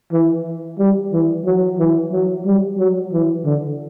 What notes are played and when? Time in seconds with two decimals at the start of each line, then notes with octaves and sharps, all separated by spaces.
0.12 E3
0.79 G3
1.13 E3
1.45 F#3
1.79 E3
2.12 F#3
2.45 G3
2.78 F#3
3.12 E3
3.45 D3